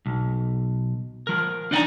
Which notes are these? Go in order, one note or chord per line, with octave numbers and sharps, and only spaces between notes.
B1
F3 A#4
D4 D#4 D5 F#5 G#5 A#5